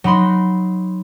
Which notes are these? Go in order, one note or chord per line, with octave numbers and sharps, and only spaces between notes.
F#3 D#4 B5 C6